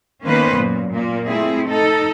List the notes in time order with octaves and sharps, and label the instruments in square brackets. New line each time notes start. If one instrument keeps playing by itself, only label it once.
[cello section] D#3 A#3 B3 C#4 B4 C5
F#2 A#2
A#2 A#3
A3 C4 E4 G#4
D#4 A4